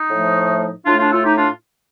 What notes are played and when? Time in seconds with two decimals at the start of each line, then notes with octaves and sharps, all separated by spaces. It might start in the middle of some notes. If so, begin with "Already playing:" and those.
Already playing: D#4
0.09 A2 F3 A3
0.86 A2 A3 D4 F4
0.99 D4 F4
1.12 F4 A4
1.24 D#4 G4
1.38 D4 F4